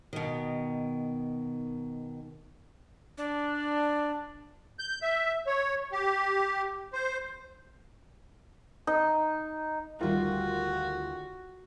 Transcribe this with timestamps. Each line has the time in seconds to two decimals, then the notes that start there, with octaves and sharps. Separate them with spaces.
0.13 B2 D#3
3.18 D4
4.79 G6
5.02 E5
5.47 C#5
5.92 G4
6.93 C5
8.87 D#4
10.01 D2 D#3 G3 F4 F#4